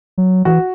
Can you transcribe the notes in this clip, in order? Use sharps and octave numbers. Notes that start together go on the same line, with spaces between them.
F#3
E3 F#4